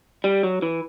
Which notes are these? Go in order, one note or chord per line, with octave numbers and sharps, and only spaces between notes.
G3
F#3
E3